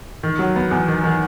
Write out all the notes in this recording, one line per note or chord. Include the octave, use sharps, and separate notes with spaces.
D#3
F#3
B3
E2
D#3
D#3